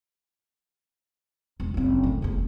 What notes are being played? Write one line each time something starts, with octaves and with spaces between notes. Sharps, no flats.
E1
F#1 C4
A2 D#3
F1 E2